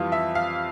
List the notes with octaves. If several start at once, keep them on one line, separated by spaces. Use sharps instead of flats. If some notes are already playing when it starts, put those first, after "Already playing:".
Already playing: F2 E3 G3 F4
E5
F5